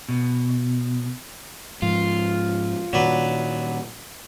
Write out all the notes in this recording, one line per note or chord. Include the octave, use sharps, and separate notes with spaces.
B2
G#2 F3 F4
A#2 D#3 F#3 D4 B4